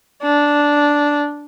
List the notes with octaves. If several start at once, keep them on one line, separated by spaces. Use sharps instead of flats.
D4